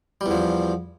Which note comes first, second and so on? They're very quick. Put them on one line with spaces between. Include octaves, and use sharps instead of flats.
G3 E2 F3